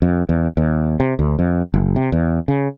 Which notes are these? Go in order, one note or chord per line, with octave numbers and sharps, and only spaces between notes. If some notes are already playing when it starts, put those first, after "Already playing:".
F2
E2
D#2
C3
D2
F2
F#1
C3
E2
C#3